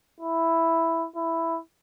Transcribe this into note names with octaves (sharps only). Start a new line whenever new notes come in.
E4
E4